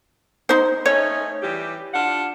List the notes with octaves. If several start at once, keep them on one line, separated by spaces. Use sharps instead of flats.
D#4 C5
A3 C#4 D#4 C#5
E3 G3 G4
D4 F4 F#5